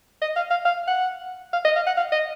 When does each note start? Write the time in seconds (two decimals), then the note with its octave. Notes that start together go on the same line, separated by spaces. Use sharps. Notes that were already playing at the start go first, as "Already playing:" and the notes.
0.22 D#5
0.36 F5
0.51 F5
0.65 F5
0.87 F#5
1.53 F5
1.65 D#5
1.76 F5
1.87 F#5
1.97 F5
2.12 D#5